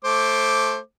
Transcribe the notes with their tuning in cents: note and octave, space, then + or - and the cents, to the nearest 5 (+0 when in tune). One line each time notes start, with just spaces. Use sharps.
A3 -5 C5 +15 D6 +0